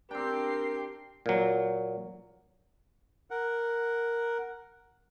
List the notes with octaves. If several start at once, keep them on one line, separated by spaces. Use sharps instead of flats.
C4 D4 G4 A#4 G5 C7
A#2 F#3
A#4 F#5